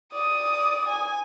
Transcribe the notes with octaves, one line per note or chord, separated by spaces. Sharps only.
D5 D#6
G#5